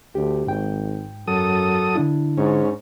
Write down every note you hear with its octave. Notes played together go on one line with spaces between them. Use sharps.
D2 G4
G#1 G#2 G5
F#2 F#3 A4 D#6
D3 D4 E4
G#2 C#4